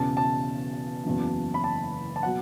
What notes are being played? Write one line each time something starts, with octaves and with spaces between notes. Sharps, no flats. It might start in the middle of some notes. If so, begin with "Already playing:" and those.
Already playing: E1 E2 C#3 A5
A5
F#1 E2 C#3 F#3
B5
A5
A5
B2 F#3 F#5